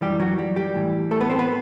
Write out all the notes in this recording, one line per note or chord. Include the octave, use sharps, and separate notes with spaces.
F#2 E3 G3 G4
F#3 F#4
G3 G4
G3 G4
A2 E3
A3 A4
B3 B4
C4 C5
B3 B4